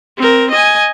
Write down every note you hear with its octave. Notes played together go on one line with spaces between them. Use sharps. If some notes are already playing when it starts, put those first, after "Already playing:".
C4 A#4
D#5 G#5